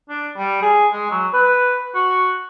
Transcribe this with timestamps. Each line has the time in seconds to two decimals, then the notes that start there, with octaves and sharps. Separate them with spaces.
0.09 D4
0.37 G3
0.62 G#4
0.92 G#3
1.11 F#3
1.33 B4
1.95 F#4